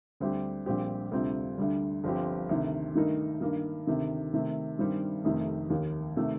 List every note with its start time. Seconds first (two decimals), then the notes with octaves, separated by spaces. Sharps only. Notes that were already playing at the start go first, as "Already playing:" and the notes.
0.20 D2 D3 G3 C4 G4
0.66 A#1 A#2 G3 C4 G4
1.11 D2 C3 G3 C4 F4
1.58 D2 D3 G3
2.04 G1 G2 F3 C4 G4
2.49 D2 C3 D#3
2.95 G2 D#3 A3 D#4 A#4
3.41 G2 D#3 A#3
3.87 D2 C3 D#3
4.33 C3 D#3 A3
4.79 G2 D#3 G3 C4
5.24 F1 F2 C3 D#3 A3
5.70 D#2 D#3 A#3
6.16 C3 D#3 A3